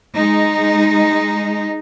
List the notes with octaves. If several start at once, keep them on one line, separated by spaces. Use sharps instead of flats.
G#3 D#4